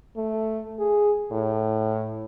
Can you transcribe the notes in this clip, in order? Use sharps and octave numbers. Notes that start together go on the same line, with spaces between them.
A3
G#4
A2